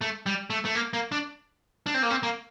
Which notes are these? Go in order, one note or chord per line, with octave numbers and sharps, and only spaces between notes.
A3
G3
A3
A3
A#3
A#3
D4
D4
C4
A#3
C4
A#3